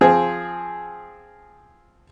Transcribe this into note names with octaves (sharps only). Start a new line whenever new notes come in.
F3 C4 G#4